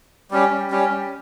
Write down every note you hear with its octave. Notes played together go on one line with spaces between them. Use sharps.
G3 C#4 G4
G3 C#4 G4